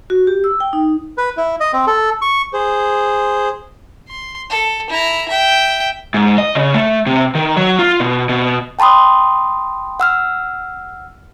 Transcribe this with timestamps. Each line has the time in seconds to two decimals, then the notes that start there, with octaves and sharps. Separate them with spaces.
0.10 F#4
0.27 G4
0.44 E6
0.60 G5
0.73 D#4
1.18 B4
1.37 E4
1.60 D#5
1.73 C4
1.87 A4
2.22 C#6
2.53 G#4 C5
4.09 C6
4.50 A4
4.90 E4 A#5
5.28 E5 G5
6.14 G#2
6.38 D#5
6.55 C#3
6.74 A3
7.06 C3
7.35 D#3
7.56 F#3
7.79 F4
8.00 B2
8.29 B2
8.79 G5 A5 B5 C6 D#6
10.00 F#5 E6 F6